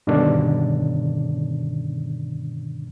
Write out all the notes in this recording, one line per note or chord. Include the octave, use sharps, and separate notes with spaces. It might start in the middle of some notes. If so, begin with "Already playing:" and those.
G2 B2 D3 D#3 C#4 D4